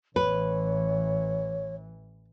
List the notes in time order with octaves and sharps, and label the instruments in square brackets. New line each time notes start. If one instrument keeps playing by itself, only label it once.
[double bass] A1 E3 [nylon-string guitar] B4 [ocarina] C#5